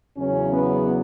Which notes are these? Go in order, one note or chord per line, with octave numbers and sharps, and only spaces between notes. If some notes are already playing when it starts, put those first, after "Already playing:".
E2 C#3 F#3 C#4
B3